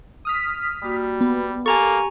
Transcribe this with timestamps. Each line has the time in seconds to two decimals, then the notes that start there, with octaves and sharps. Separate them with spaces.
0.25 D#6 F6 B6
0.83 G3 A#3 F#4 D6
1.21 B3
1.66 A#3 G4 A4 G#5 A#5 C#6